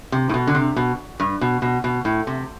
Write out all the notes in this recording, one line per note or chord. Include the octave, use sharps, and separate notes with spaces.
C3
A2
B2
D3
C3
B2
G2
B2
B2
B2
A2
C3